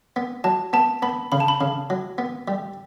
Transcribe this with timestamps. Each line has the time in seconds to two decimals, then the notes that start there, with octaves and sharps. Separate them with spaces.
0.16 B3
0.44 F#3 A5
0.73 B3 A5
1.02 B3 B5
1.32 C#3 B5
1.40 A5
1.48 B5
1.61 C#3
1.90 F#3
2.18 B3
2.48 G3